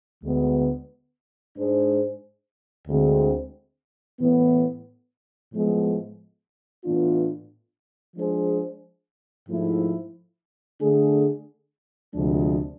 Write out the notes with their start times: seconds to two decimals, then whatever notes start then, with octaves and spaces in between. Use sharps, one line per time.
0.23 D2 D3 G#3 B3
1.56 G#2 G#3 D4 G#4 C5
2.87 D2 D3 G#3 C4 G#4
4.19 A2 E3 B3
5.52 A2 F3 G#3 B3
6.84 A2 E3 B3 D4 F4
8.16 F3 G#3 D4 G#4 C5
9.48 G#2 F3 A3 E4
10.81 D3 A3 D4 G#4
12.13 D2 C3 F3 G#3 D4